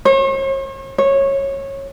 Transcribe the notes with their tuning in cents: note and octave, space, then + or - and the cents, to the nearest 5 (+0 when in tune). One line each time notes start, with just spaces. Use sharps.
C#5 -45
C#5 -15